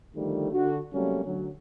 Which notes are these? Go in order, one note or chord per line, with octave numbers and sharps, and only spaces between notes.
D3 D#3 F3 G3 A3
D3 F#4
C3 F#3 G3 A3 A#3 C#4
D2 F#3